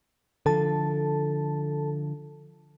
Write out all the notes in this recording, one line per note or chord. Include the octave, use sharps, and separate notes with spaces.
D3 F3 A4 A5